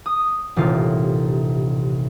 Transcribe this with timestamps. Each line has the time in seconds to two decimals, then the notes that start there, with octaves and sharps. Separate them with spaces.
0.06 D#6
0.56 D#1 A1 C3 F4